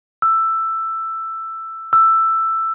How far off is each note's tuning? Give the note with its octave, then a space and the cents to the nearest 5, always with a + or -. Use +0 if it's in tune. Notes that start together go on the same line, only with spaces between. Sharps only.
E6 +10
E6 +10